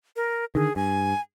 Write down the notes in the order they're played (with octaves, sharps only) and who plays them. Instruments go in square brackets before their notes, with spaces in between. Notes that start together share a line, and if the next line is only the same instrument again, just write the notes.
[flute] A#4
[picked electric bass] D3 D#3 [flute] G#4
[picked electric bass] G2 [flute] G#5